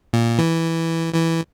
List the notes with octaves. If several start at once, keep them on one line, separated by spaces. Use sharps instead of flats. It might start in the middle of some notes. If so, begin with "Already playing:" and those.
A#2
E3
E3